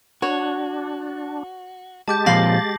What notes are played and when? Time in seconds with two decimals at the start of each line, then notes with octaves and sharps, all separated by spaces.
0.22 D4 F#4 C#5
2.08 G#3 G4 A5 D6 G6 A6
2.26 A#2 F3 C4 F5 C6 A#6 C7 F#7